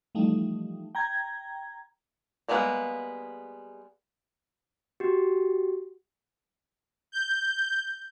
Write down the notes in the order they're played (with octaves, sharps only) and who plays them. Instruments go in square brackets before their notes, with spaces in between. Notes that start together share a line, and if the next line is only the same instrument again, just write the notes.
[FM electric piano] E3 F3 G3 A3 D#4
G5 A#5 G#6
[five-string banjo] G3 G#3 A#3 B3 F5
[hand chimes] F#4 G4
[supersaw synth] G6